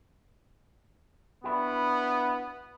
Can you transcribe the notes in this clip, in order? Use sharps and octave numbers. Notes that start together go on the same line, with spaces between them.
B3 D4 E4 F#4